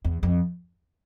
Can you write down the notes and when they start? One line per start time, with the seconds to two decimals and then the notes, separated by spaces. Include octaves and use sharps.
0.05 E2
0.23 F2